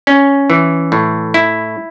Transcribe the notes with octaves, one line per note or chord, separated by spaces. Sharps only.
C#4
E3
A2
E4